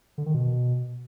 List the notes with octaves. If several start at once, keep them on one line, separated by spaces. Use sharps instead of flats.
D3
D#3
B2